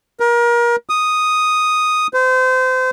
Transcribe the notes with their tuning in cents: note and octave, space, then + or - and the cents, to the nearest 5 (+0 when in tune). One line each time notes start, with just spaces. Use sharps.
A#4 +30
D#6 +0
C5 -30